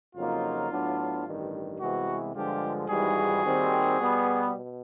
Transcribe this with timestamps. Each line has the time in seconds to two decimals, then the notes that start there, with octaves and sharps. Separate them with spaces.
0.15 F2 C#3 F#3 A#3 D#4 F4
0.70 A2 F#3 B3 D4
1.25 A1 G2 D#3
1.80 C2 C3 E3 G#3 B3 F#4
2.34 G2 D3 F3 G#3 F4 G4
2.89 G#1 G#2 E3 G3 F#4 G#4
3.44 D#2 D#3 G3 C4
3.99 B2 G3 B3
4.53 B2